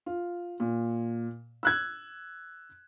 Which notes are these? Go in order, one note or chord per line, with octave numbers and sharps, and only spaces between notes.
F4
A#2
E6 F#6 G#6